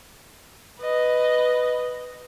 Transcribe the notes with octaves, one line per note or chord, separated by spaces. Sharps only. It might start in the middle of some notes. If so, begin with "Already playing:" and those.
B4 D#5